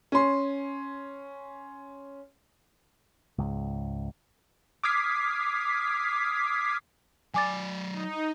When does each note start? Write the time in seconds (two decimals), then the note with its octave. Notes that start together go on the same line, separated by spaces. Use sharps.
0.12 C#4 C6
3.38 C#2 G#2
4.84 D6 D#6 F6 G#6 B6 C7
7.34 F#3 D5 G#5 D6 A6
7.90 D#4